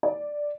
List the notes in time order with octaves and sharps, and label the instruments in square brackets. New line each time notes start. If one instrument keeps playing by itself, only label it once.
[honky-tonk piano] D5